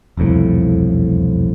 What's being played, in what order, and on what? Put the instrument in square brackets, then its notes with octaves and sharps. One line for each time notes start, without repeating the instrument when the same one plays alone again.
[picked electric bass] E1 C2 F2 A2